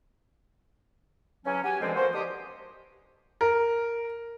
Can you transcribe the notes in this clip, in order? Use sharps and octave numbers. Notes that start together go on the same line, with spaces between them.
C#3 E3 F#3 C#4
F#4 G4 G#5
B2 D3 E3 F3 G#3 C4
A#3 B3 F#4 C5
D3 D#3 G4 D#6
A#4